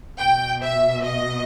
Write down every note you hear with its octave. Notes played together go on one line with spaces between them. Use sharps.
B2 G5
E5
D#5